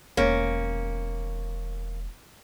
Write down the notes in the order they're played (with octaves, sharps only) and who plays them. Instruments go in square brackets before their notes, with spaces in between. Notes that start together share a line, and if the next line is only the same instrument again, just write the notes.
[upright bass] E1 D#3 [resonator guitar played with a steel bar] A#3 C#4